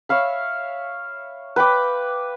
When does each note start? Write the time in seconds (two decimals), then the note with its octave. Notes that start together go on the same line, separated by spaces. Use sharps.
0.09 C#5 E5 F5 B5
1.56 B4 G5 B5 D6